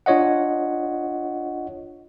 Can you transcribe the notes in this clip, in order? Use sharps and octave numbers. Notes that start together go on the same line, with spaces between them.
D4 F4 C#5 D#5 F#5